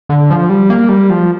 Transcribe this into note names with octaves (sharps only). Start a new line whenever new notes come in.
D3
F3
G3
A#3
G3
F3